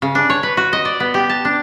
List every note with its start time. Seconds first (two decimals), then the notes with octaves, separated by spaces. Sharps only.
0.02 C#3
0.15 D4
0.30 C#5
0.43 B4
0.57 F#4
0.73 D#5
0.85 D5
1.00 B3
1.14 G4
1.29 A5
1.45 D4